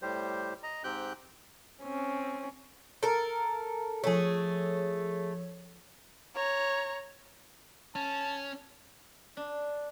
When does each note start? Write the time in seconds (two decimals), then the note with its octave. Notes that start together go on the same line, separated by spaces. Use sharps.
0.02 A2 G3 G4 C5
0.63 D#5 A#5
0.84 G#2 C4 G4 G5 F#6 G6
1.83 C4 C#4
3.03 A4 A#4
4.04 F3 A3 G#4 A4 C#5
6.35 C#5 A#5
7.96 C#4 A5
9.37 D4